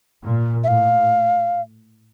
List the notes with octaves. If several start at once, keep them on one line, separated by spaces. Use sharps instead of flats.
A#2
E5
A2 F5